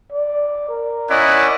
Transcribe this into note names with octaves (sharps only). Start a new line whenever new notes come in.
D5
A#4
C#4 E4 D5 D#5 F#5